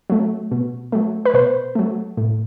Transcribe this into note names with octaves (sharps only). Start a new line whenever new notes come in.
F#3 A3
B2
F#3 A3
B4
B2 C5
F#3 A3
A2